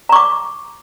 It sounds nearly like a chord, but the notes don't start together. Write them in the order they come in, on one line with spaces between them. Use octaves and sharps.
A#5 C#6 D6